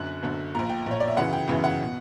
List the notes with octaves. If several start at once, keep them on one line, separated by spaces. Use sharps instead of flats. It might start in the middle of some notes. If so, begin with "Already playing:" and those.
Already playing: F#1 F#2 D3 F#6
F#1 F#2 D3
A#1 A#2 A#5
G5
A#1 A#2 C#5
D5
E5
G1 F#2 C#3 E3 F#5
G5
G1 F#2 C#3 E3
F#5
B2